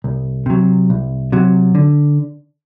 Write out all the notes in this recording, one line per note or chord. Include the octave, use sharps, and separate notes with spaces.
C2
C3 F#3
C2
C3 F#3
D3